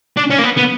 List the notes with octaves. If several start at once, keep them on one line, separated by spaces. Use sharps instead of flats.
D4
C#4
A#3
B3
B3